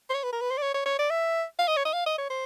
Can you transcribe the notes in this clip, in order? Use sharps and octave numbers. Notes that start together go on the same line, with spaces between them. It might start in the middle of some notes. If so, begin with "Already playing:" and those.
C5
C#5
B4
A#4
B4
C5
D5
C#5
C#5
C#5
D5
E5
F5
D#5
C#5
D#5
F5
D#5
C#5
C5